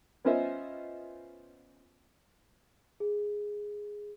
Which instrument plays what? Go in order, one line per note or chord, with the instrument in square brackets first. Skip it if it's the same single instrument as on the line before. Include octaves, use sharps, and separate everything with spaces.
[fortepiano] B3 C#4 F4 C5 D#5 E5
[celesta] G#4